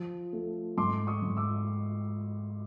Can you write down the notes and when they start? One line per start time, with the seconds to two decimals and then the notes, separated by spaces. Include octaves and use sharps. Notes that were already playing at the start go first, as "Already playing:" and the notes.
Already playing: F3 C6
0.33 A3
0.77 G#2 C6 D6
1.07 C#6 D#6
1.23 G#2
1.37 D6 E6